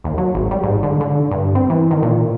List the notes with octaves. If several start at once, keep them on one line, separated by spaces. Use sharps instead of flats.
D#2
F#3
G#1
G3
G#2
D3
D3
G2
C4
E3
D#3
A#2